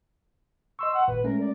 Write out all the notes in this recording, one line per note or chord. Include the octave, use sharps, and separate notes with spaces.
D#5 C6 C#6 E6
F#5
G#1 A#2 B4
G#3 A3 C#4 A#4
D5